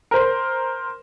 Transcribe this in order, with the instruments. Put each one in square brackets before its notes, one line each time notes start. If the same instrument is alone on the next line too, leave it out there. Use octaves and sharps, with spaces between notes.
[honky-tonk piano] A#4 C5